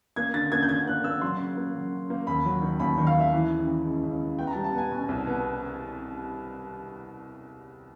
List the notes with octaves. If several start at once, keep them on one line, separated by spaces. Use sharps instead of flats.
A#3 G#6
D3 A6
A#3 G#6
G6
D3 G#6
A#3 F#6
A#3 E6
F#3 C6
C#3
A#3
F#3
C#3
A#3
D#2 B5
F#3
D#3
D#2 B5
D#3
F5
D#2
E5
E3
C#3
E3
C#2
C#2
C#3
B3 G5
A#5
A5
G3
A5
B3 G#5
B2
C2
B3